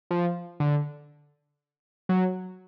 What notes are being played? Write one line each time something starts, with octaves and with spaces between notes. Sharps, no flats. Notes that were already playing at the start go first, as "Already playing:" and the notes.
F3
D3
F#3